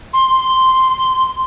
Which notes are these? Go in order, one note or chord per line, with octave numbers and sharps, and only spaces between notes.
C6